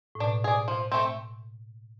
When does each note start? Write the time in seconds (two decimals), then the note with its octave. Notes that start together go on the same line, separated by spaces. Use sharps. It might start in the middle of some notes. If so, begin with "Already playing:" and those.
0.15 A2
0.20 B2 D4
0.44 G#4 D5
0.68 F3
0.92 A3 C4